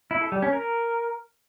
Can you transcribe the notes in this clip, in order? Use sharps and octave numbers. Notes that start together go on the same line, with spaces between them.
E4
A4
G3
C#4
A#4